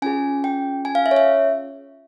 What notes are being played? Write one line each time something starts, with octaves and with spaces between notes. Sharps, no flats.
C#4 F4 G#4 G#5
G5
G#5
F5
E5
C#5
E5